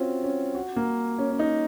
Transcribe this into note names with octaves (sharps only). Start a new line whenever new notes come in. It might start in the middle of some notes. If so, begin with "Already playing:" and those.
Already playing: C4 C#4 F4 F#4
C#4
F#4
A#3
C#4
C#4
D#4